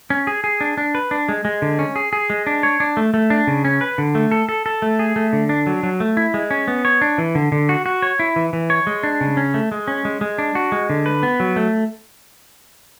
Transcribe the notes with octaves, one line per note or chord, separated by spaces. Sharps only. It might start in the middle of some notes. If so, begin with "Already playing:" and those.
C#4
G#4
G#4
D4
D4
B4
D4
G#3
G#3
D3
C#4
G#4
G#4
G#3
D4
C#5
D4
A3
A3
D4
C#3
C#4
B4
D3
A3
A4
A4
A4
A3
G#4
A3
D3
D4
F#3
F#3
A3
E4
G#3
C#4
B3
C#5
D4
E3
D3
D3
F#4
F#4
C#5
E4
E3
E3
C#5
G#3
D4
C#3
C#4
A3
G#3
C#4
G#3
G#3
D4
F#4
G#3
D3
B4
B3
F#3
A3